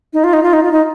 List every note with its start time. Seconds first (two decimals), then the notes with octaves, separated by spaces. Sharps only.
0.13 D#4
0.24 F4
0.33 D#4
0.43 F4
0.53 D#4
0.63 F4
0.72 D#4